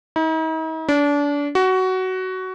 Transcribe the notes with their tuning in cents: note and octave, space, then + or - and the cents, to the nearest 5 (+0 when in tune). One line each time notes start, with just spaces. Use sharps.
D#4 +45
D4 -30
F#4 +15